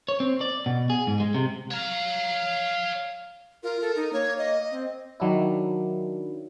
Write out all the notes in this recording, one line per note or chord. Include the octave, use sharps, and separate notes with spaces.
C#5
C4
D5
B2
G#4
G#2
G#3
C3
C#5 F5 A#5
F4 A#4
A4
D#4
A#3 C#5
D#5
C4
D#3 F#3 D4 E4